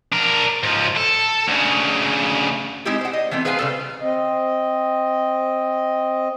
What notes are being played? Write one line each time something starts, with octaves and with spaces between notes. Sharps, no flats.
D4 A#4
G#2 F3
A4
D2 C#3
G#3 C4 D#4 E4 G4
C5 F#5
D#5
E3 A3 B3 C4
G#4 B4 C5 F5 G5 G#5
C#3 G3 A4
C4 D#5